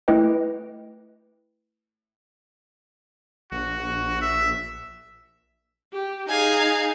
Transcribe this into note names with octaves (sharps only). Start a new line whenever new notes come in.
A3 E4 B4 D#5 G5
A#1 F#4
E5
G4
D#4 G#4 F5 G#5